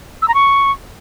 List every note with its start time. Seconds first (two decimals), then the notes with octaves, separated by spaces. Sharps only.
0.22 E6
0.28 A#5
0.34 C#6